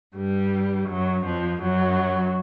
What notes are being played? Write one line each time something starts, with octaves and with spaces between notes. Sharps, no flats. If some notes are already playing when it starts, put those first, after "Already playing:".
G2 G3
F#2 F#3
F2 F3
F#2 F#3